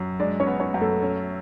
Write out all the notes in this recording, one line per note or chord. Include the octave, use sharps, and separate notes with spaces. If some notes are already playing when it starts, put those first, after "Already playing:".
Already playing: F#2
G#3 D4 D5
C#4 C#5
B3
C#4 C#5
F#2
A3 A4
C#4